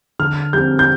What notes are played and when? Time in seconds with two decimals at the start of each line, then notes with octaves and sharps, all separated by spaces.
0.19 D3 F6
0.53 G3 C4 G6
0.79 G6